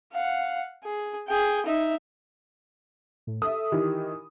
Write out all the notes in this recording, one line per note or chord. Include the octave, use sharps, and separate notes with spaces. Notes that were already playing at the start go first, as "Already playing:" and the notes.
F5 F#5
G#4
G#4 G5
D#4 E5
A2
A4 E5 D#6
D#3 E3 G4